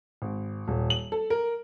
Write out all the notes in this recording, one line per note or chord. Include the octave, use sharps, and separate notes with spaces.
G#1
D#1
F#7
A4
A#4